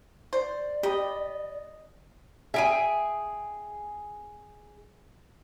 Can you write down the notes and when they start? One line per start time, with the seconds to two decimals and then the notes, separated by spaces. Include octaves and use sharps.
0.33 C5 D5
0.83 G4 D#5 B5
2.54 G#4 E5 G5 G#5